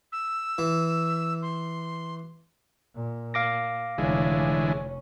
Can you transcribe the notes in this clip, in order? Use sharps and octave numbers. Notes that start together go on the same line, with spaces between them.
E6
E3
C6
A#2
F5 D6 A#6
F1 D3 E3 G#3 C#4